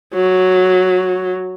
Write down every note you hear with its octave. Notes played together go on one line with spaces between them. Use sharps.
F#3